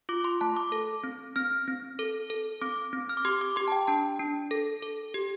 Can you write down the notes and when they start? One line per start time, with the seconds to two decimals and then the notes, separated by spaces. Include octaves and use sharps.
0.09 F4 D6
0.24 C6
0.41 A3 A5
0.56 D6
0.72 A4
1.04 C4
1.36 C4 F6
1.68 C4
1.99 A4
2.30 A4
2.61 C4 D6
2.93 C4
3.09 F6
3.17 D6
3.25 G4 C6
3.41 D6
3.56 G4 C6
3.68 A5
3.72 G5
3.88 D4 A5
4.19 D4
4.51 A4
4.82 A4
5.14 G4